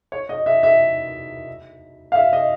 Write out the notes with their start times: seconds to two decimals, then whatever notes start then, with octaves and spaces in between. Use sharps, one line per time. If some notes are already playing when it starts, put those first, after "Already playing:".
0.12 C#5
0.29 D#5
0.46 E5
0.63 E5
2.12 F5
2.15 E5
2.33 D#5